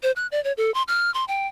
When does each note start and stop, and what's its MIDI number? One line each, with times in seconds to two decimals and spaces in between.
0.03 0.11 72
0.16 0.27 90
0.32 0.42 74
0.44 0.52 73
0.57 0.73 69
0.74 0.83 84
0.88 1.12 89
1.14 1.25 84
1.28 1.47 79